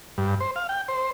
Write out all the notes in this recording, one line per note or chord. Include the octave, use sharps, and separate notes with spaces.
G2
C5
F5
G5
C5